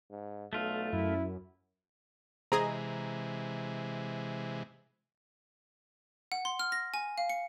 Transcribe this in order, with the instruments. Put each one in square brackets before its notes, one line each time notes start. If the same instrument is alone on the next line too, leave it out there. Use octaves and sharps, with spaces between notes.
[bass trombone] G#2
[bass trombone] B1 [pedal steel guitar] A3 F4
[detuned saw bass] F#2 [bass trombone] E4
[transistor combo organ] C3 E3 G#3 [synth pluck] C4 G#4 D#5 [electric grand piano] A#5
[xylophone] F#5
C6
F6
A#6
G#5
F5
C#7